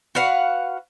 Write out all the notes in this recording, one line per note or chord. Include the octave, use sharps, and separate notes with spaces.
F#4 B4 F5 F#5